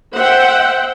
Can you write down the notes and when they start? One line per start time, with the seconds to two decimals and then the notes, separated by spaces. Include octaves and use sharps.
0.14 C5 E5 F#5 G5